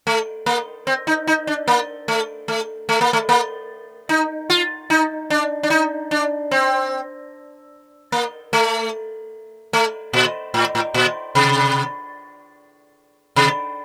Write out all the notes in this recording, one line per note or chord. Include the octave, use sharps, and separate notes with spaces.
A3
A#3
C4
D#4
D#4
D4
A#3
A3
A3
A3
A#3
A3
A#3
D#4
F4
D#4
D4
D4
D#4
D4
C4
A#3
A3
A3
A#2
A2
A2
A#2
C3
C3